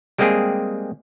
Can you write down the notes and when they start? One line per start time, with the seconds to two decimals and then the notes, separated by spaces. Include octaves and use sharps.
0.18 G3 G#3 A#3 C4 G4 G#4